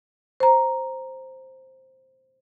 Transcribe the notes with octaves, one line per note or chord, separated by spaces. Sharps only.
C5 A#5